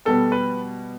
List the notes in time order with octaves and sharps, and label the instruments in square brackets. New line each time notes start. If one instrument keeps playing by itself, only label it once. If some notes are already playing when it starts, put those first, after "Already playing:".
[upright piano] B2 G3 B3 [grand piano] A4
[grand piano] B4